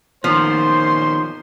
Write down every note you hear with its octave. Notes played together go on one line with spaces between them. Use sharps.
A#2 D#3 F3 B3 C#4 C5 C6